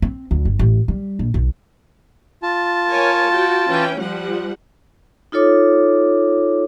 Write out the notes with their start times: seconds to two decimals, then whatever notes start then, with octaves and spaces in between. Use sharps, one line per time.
0.02 C4
0.31 D2
0.45 G1
0.59 A1
0.88 G3
1.19 A#1
1.34 B1
2.43 F4 A5
2.87 A#4 C#5 G#5
3.32 F#4 G5
3.69 E3 C#4 G5
3.99 F3 G3 F#5
5.32 D#4 F4 A4 C#5 D6